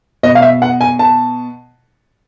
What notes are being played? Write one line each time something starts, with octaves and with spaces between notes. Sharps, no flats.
B2 D#5
F5
E5
F#5
G#5
A5